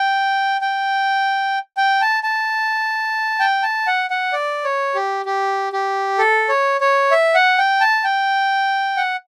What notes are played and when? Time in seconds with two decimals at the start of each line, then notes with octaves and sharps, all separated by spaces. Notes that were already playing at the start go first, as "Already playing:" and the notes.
Already playing: G5
0.61 G5
1.77 G5
2.01 A5
2.23 A5
3.39 G5
3.63 A5
3.87 F#5
4.10 F#5
4.33 D5
4.64 C#5
4.95 G4
5.25 G4
5.73 G4
6.18 A4
6.49 C#5
6.81 C#5
7.11 E5
7.35 F#5
7.58 G5
7.81 A5
8.04 G5
8.97 F#5